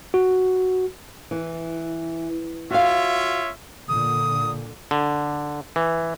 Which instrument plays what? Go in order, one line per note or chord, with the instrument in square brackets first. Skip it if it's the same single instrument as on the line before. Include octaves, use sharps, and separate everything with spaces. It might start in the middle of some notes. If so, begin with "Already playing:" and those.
[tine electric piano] F#4
[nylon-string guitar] E3
[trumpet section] F4 C#5 E5 [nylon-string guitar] F#4 F5
[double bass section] A#2 D3 [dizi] D#6
[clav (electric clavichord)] D3
E3